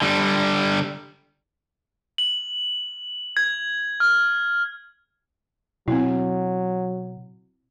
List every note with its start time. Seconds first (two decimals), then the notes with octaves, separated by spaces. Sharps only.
0.02 D3 G3
2.18 F#7
3.37 G#6
4.00 F6
5.88 B2 F#3 C4 E4